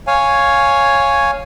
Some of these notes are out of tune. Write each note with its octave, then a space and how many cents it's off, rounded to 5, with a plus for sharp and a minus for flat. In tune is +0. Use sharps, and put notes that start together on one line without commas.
C#5 +0 F5 +0 G#5 +0